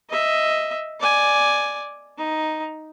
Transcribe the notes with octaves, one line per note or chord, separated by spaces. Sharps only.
D#5 E5
D5 G#5
D#4